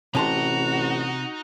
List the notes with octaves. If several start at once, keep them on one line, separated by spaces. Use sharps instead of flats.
A1 C3 D#4 F#4 A5 A#5 C6